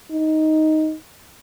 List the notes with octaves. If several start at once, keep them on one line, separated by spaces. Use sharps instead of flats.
D#4